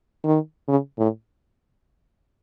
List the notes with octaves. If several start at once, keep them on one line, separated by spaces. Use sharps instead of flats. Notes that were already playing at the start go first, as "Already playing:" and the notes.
D#3
C#3
A2